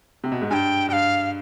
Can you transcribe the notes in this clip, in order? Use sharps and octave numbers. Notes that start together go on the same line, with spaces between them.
C3
B2
G#2
G2 G5 G#5
G2 F5 G5